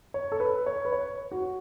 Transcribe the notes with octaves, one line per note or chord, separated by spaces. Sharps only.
C#5
A4
B4
C#5
B4
C#5
F#4